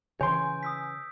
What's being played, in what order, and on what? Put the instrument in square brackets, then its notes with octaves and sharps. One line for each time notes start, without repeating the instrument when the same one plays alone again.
[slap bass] C#3 E3 [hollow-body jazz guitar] C#5 C6 [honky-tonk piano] G#5 [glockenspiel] G6 D7
[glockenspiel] D#6 E6 B6